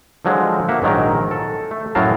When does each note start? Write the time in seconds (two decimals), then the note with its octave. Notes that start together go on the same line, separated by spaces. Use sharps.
0.25 D3 F3 F#3 G#3
0.69 A#3 E5 F#5
0.82 A#1 G#2 D#3 F#3 A#4
1.31 A4
1.71 A3
1.95 F#2 A2 F#3 A#4 F5 A5